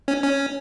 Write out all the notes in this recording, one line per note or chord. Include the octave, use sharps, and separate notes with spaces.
C#4
C#4